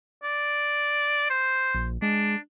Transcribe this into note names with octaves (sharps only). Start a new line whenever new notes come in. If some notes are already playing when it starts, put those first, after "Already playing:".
D5
C5
A#1
G#3 D4